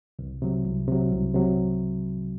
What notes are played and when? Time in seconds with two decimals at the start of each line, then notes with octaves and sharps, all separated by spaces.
0.19 C2
0.42 C3 F#3
0.65 C2
0.88 C3 F#3
1.12 C2
1.34 C3 F#3